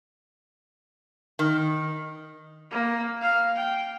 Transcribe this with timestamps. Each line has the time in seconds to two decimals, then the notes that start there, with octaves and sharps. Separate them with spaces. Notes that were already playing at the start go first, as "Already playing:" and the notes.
1.39 D#3
2.71 A#3
3.21 F5
3.56 G5